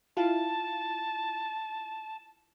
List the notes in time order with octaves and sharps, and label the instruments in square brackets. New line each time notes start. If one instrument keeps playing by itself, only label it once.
[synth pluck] E4 F4 F5 [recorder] A5